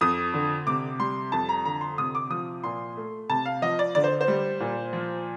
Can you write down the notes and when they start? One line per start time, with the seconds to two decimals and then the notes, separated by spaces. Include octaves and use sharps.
0.01 F2 D#6
0.34 D3
0.67 C3 D6
0.99 G3 C6
1.32 F2 A5
1.49 A#5
1.65 D3 A#5
1.81 C6
1.98 C3 D#6
2.15 D6
2.30 F3 D#6
2.64 A#2 C6
2.97 A3
3.29 C3 A5
3.46 F5
3.62 F3 D#5
3.79 D5
3.95 D3 D5
4.04 C5
4.21 C5
4.28 G3
4.60 A#2
4.93 F3